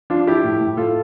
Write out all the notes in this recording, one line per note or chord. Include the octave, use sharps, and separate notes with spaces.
F3 D4 F4
F3 E4 G4
A2
A2
A2 F4 A4